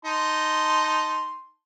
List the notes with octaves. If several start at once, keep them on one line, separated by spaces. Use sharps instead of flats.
D#4 A5 C6